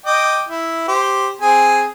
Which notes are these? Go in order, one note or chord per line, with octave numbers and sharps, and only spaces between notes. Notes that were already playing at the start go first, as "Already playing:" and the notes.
D#5 G5 D6
E4
G4 C5
C4 G#4 G#5